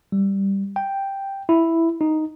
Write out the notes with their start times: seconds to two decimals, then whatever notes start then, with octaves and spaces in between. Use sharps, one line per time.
0.12 G3
0.76 G5
1.49 E4
2.01 D#4